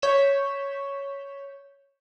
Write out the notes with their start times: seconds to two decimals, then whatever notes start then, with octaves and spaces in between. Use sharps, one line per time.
0.02 C#5 G6 B6 E7